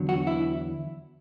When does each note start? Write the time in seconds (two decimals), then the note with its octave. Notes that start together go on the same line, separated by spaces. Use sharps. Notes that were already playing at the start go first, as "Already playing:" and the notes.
Already playing: E2 D3 F#3
0.09 F#4
0.27 E4